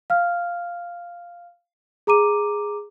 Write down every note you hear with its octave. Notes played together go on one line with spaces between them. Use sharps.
F5 F6
G#4 A#5 D6 D#7